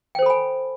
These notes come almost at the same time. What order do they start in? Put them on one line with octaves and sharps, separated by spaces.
G5 C5 A4 B5 G#5